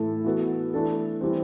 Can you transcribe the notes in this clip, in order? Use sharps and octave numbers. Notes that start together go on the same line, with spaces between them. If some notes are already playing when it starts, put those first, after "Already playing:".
Already playing: A2 E3 A3 E4 A4
E3 B3 F#4 A4
E3 A3 D4 A4
E3 G3 C4